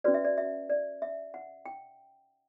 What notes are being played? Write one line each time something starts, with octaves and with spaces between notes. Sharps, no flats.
C#4 F#4 B4 D5
E5
D5
E5
D5
E5
F#5
G5